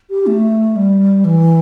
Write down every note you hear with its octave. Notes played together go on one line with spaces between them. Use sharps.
G4
A3
G3
E3